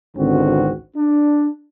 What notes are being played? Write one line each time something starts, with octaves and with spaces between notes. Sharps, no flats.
G#1 C#2 D3 C4 F#4
D4